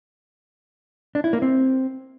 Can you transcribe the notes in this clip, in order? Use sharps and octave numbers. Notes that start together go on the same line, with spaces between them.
D4
E4
A#3
C4